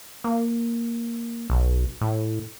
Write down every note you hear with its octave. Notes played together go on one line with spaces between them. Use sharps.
A#3
B1
A2